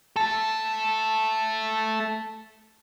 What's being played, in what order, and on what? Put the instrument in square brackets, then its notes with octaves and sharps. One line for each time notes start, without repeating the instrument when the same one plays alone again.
[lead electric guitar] A3 A4